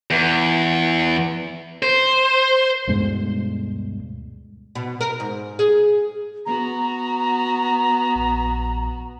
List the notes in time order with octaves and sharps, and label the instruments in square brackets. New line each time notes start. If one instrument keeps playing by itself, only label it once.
[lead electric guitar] E2
C5
[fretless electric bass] D2 G2 B2 G#3
[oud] B2
A#4
G#2
G#4
[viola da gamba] B3 F#4 [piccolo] A#5
[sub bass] A#1